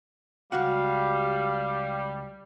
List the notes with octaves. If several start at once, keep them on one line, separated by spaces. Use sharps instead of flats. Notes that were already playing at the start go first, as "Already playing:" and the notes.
C#2 G3 F#4 F5 F#5